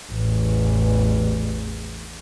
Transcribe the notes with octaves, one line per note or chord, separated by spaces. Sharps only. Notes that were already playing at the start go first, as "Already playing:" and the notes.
A1 E2